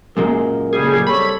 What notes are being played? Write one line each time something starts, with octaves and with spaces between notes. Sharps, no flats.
F#2 A#2 G#3 A#4
A2 C#3 G3 A#3 G#4
G3 C4 A4 C#5 B5